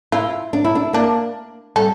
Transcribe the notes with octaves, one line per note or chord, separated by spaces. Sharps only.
E4 F4
D4
E4
D4
A#3 D4
G3 A4